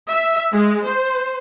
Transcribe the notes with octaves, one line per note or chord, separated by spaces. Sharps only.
E5
G#3
C5